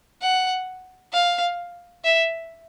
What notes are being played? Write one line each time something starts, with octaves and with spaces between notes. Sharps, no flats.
F#5
F5
E5